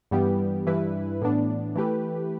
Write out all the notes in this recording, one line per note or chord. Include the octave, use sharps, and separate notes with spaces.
G2 E3 G3 B3 G4
G2 E3 G3 E4 B4
A2 E3 B3 D4
E3 A3 G4 B4